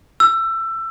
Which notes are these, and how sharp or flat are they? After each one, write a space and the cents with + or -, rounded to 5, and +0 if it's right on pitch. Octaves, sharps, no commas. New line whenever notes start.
E6 +20